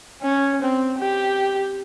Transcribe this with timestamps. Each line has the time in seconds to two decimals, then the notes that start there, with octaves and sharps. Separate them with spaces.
0.22 C#4
0.62 C4
0.99 G4